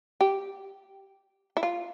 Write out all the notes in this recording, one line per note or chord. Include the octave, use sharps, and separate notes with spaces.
G4
E4
F4